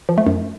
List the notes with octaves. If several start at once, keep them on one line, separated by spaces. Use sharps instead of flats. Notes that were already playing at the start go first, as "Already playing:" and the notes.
F3
A3
F#2